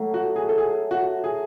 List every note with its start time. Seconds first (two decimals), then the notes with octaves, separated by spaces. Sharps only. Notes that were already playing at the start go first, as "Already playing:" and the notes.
Already playing: F#3 A3
0.14 F#4
0.36 G#4
0.49 A4
0.58 G#4
0.91 F#4
1.24 G#4